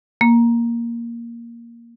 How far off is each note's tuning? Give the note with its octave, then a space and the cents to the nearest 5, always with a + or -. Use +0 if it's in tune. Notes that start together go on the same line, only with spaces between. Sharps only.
A#3 +5